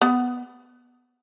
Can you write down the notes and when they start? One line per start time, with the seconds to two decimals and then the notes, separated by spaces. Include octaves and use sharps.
0.01 B3